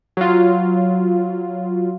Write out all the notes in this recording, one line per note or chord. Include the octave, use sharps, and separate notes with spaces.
F#3 F4